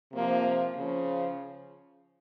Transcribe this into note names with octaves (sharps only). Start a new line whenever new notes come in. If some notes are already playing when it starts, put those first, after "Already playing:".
C3 F3 A#3
C#3 F3